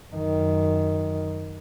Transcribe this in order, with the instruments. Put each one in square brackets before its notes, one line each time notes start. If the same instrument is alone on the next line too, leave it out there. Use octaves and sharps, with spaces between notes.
[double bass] F#2 D#3